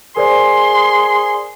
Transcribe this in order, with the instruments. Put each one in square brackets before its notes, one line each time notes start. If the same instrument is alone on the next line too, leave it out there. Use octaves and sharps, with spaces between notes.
[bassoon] G#4 [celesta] A#4 C5 D5 [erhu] C6